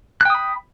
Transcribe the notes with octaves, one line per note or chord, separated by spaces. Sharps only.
G5 B5 D#6 F#6